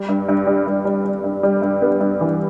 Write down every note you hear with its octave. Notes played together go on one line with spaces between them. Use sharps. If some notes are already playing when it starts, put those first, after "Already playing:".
Already playing: G3
G2
G2
G3
G2
G3
G3
G2
G3
G2
B3
G2
E3